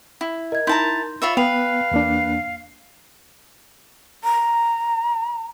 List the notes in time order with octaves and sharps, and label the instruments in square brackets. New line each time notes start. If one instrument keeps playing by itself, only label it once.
[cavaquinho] E4
[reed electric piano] A#4 [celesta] D#5 G#6
[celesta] D#4 C6 G6 [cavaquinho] E4 A5 A#5
[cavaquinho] F4 C#5 E5 [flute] B5
[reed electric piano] B3 [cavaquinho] B4 [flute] F5 [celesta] G5 F7
[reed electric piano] E2 A#3 D4
[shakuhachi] A#5